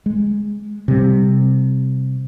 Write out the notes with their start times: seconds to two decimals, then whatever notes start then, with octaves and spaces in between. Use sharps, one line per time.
0.06 G#3
0.88 C3 G3